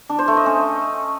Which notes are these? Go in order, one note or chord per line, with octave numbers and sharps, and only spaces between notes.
D4
C5
A3
D#5
C#4